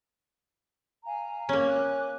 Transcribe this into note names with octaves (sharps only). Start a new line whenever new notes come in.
F5 G#5 A#5
A#3 C#4
G#5 D6 F#6